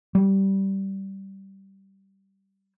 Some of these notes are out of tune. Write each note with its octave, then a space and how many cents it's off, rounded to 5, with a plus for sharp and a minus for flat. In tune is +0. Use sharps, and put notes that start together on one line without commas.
G3 -15